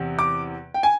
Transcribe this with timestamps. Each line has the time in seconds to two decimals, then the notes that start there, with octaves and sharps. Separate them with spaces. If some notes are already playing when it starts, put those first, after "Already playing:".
Already playing: E2 C3
0.19 D6
0.74 G5
0.83 G#5